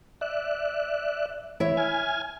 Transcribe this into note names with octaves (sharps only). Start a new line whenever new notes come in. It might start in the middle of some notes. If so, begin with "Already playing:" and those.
D5 E5 F#6
E3 E4 C#5 E5
G#5 F6 G#6